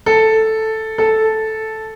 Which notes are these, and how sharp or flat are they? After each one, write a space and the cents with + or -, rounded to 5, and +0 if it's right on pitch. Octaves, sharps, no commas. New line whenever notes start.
A4 +0
A4 -5